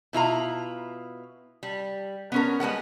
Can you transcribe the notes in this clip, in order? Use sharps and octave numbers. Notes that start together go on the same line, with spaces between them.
B2 E4 F4 A#5
G3
B3 C#4 A#4
G3 G#3 B3 F#5